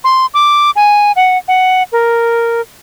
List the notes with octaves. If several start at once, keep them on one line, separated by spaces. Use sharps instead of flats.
C6
D6
G#5
F#5
F#5
A#4